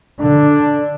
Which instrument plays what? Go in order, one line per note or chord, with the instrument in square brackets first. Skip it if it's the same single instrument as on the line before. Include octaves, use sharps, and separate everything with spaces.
[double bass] D3 [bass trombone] D4